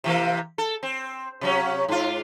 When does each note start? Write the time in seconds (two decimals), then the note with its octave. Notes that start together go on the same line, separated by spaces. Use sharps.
0.04 C3 E3 A#3
0.58 A4
0.83 C4
1.41 C3 F#3 C#4
1.88 G#2 F4